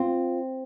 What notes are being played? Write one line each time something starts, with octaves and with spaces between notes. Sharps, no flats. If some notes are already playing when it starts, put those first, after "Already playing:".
Already playing: C4 F4